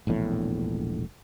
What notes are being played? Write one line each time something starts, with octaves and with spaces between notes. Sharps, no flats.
E1 A#1 E2 A2